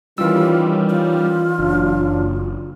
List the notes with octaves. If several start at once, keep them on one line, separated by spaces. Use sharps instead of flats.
D#3 E3 G3 C#4 F4 E6
F4
F#1 F#3 D4